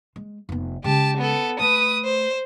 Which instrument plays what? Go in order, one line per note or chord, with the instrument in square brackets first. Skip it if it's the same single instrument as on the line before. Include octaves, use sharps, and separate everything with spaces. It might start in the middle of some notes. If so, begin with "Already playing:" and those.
[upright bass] G#3
F1 B3
[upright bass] C#3 G#3 [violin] G4 A5
[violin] B3 A4
[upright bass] A3 [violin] B4 D#6
[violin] C5